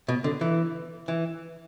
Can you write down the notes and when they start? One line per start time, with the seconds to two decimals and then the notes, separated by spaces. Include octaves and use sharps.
0.08 B2
0.24 D3
0.41 E3
1.08 E3